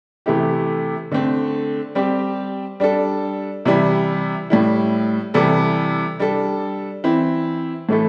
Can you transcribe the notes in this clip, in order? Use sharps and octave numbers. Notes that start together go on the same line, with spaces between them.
C3 E3 A3 E4 G4
D3 A3 C4
G3 C4 G4
G3 D4 A4
C3 E3 G3 E4
A2 G3 E4
C3 E3 G3 E4 A4
G3 D4 A4
E3 C4 E4
A2 E3 A3 E4 A4